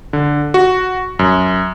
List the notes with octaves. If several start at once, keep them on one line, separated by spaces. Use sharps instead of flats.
D3
F#4
F#2